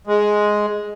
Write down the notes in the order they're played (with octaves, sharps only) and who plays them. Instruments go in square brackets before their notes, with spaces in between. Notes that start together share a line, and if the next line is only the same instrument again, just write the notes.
[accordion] G#3